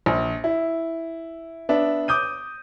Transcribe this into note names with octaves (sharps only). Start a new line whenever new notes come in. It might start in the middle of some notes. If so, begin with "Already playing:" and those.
A#1
E4
B3 D4 E5
D6 D#6 G6 D#7